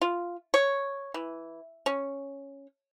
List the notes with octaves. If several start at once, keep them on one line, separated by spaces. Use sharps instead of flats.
F4
C#5
E3
C#4